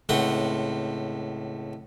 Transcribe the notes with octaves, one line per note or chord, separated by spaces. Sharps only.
C#2 A2 C4 F#5 C6